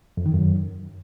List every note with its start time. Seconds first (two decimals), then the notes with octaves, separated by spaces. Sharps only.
0.17 F2
0.26 D#3
0.34 F#2